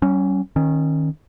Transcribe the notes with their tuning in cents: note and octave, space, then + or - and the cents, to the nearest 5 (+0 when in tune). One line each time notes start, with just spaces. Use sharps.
G3 -40 C#4 +0
D#3 +0 C#4 -25